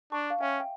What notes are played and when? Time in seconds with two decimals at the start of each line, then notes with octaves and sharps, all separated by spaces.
0.12 D4 A5 C#6
0.30 F5
0.41 C#4 E5 G5
0.60 G5